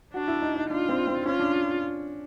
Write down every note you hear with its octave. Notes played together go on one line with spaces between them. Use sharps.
D4 F#4
E4
D#4
D#4
D4 F4
C4
C4
C#4 F4
D4